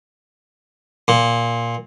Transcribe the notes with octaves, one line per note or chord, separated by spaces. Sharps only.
A#2